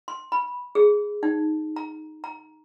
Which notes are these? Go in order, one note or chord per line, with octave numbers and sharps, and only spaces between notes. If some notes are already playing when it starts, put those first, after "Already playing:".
C6
B5
G#4
D#4
A#5
A#5